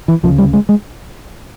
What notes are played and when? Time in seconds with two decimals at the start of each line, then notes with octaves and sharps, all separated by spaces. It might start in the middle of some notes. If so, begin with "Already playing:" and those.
0.08 E3
0.23 D2 C#3 F3
0.38 G3
0.53 G#3
0.69 G#3